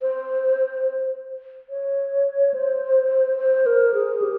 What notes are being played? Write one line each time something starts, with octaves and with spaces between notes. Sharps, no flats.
C5
C#5
C5
C5
A#4
G#4
G4